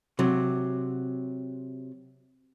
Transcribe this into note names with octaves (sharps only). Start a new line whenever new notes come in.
C3 F#3